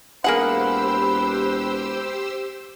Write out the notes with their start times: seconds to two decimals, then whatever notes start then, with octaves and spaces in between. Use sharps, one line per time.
0.24 E1 A#3 G4 G#4 B4 C5 F#5 E6